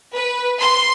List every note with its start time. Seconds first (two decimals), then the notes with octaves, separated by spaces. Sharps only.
0.15 B4
0.60 C6